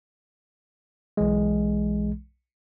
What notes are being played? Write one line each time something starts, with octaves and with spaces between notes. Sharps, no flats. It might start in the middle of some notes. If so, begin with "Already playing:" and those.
B1 E3 G#3